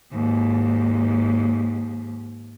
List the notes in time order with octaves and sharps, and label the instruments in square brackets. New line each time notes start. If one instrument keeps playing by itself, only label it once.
[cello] D#2 G#2